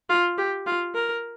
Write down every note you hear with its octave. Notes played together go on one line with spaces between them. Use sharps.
F4
G4
F4
A#4